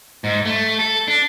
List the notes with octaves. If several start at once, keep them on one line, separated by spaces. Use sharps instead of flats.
G#2
A3
A4
D4